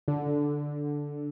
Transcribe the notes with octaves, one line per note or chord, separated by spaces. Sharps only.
D3